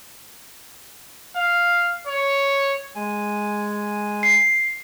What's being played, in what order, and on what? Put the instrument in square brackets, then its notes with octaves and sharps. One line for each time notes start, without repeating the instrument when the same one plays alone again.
[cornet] F5
C#5
[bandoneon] G#3 G#5
[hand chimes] C7